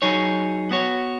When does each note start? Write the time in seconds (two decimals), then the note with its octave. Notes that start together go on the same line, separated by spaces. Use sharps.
0.02 F#3 D#4 G#4 C#5
0.71 B3 F#4 C#5